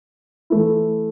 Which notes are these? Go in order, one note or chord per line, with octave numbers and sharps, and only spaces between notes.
E3 A3 E4